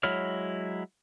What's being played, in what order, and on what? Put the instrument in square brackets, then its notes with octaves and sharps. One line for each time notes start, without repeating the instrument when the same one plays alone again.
[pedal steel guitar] F#3 G#3 E4 C#5 F6